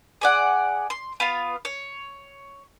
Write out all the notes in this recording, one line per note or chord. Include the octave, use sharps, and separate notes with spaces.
G#4 D5 F#5
C6
B3 F4 F5
C#5